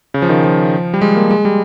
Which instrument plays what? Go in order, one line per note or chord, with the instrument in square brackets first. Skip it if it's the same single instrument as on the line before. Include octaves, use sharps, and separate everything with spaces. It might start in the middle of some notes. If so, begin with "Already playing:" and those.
[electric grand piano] C#3
F3
D#3
F3
G3
G#3
A#3
G#3
G3